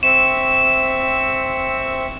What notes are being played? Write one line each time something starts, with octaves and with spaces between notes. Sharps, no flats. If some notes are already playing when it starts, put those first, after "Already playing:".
C4 E5 C#6 E7